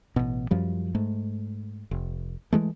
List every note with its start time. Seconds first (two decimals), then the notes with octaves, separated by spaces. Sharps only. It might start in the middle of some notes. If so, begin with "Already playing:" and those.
0.16 A1 B2
0.51 F#2 F3 G3
0.95 G#2 A3
1.91 F1
2.53 E3 G#3 A3